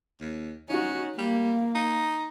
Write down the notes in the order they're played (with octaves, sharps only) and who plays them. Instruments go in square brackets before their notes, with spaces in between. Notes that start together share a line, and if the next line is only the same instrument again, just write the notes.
[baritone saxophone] D#2
[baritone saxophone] C#4 [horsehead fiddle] D#4 F#4
[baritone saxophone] G3 [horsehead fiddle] A#3
[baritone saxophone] D#4